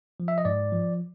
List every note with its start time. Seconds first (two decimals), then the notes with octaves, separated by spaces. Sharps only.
0.20 F3
0.28 E5
0.38 D#5
0.45 G#2 D5
0.72 F3